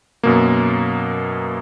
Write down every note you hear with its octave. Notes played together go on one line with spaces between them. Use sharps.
F#2 B2 A#3